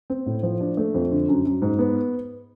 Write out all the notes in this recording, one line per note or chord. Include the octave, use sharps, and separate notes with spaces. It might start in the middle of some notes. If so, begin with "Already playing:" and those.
C4
A2
F3
D4
A3
F2
D3
F#2
F#2
G#2
B3